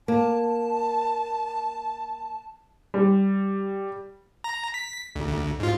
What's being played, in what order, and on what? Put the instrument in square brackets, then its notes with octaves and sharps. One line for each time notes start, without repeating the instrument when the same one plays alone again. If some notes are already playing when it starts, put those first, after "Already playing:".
[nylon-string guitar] A#3 [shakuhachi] A5
[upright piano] G3
[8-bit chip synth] A#5
B6
D2
D2
G#2 F4